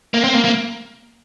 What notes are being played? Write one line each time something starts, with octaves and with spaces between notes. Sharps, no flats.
A#3
C4
A#3
A#3